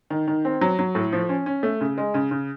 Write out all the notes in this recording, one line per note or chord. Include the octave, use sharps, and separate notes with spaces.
D#3
D#3
C4
F#3
F#3
A2
F3
C#4
C#4
A3
C#3
G#3
C#3
C#3